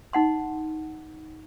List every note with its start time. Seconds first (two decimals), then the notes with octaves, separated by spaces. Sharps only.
0.13 D#4 F#5 C6